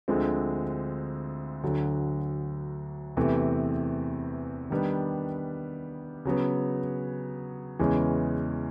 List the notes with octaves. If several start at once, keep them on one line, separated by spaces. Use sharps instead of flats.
D2 D3 F3 G#3 C4
D2 D3 F#3
E2 C3 E3 A3
D#3 G3 B3 D4
C#3 F#3 B3
E2 C#3 E3 G#3 C#4